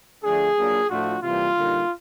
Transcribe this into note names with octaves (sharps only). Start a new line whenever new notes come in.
D3 F3 A3 D4 G#4
F#3 A#3 D4 F4
A2 F3 A3 D4 F4 F#4
C3 E3 G3 A#3 F4
D3 G3 A#3 D#4